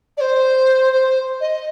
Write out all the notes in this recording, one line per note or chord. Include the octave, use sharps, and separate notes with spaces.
D5
C5
C5
D#5